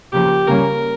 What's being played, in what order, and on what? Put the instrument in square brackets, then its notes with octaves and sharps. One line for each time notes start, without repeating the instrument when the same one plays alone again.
[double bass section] C#3 F3 A#3 [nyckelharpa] G4
[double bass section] C#3 G3 A#3 C#4 [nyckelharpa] A#4